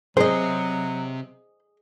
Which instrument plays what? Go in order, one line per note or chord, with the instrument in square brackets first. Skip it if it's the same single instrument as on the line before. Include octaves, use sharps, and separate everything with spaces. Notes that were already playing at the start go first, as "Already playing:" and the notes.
[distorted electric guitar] C3 [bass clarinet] F#3 [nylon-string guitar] G#4 D#5 [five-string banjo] C5